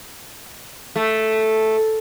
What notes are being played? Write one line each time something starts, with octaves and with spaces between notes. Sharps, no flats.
A3